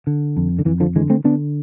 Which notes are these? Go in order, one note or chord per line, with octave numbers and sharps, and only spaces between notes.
D3
F2
D3
F2 E3
D3 F3
D3 E3 G#3
A3 C4
D3 B3 D4